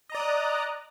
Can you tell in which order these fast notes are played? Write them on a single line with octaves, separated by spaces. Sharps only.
D#5 A#5 D5 D#6 F#6